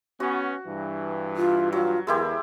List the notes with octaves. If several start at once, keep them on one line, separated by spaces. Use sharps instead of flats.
B3 C#4 F#4
G2 E3
F4
F#3 F4
E2 G#3 E4 G4 A#4